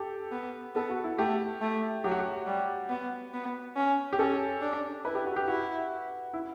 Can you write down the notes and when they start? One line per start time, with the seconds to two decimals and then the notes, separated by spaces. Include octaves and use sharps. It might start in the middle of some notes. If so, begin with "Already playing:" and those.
Already playing: G4 A4
0.32 B3
0.75 B3 A4
0.90 F#4
1.04 E4
1.18 A3 G4
1.61 A3
2.04 F#3 G4
2.11 F#4
2.19 G4
2.47 G3
2.89 B3
3.34 B3
3.76 C#4
4.13 G4
4.19 C#4 A4
4.62 D4
5.05 E4 B4
5.15 G4
5.26 F#4
5.36 G4
5.48 E4 F#4
6.33 E4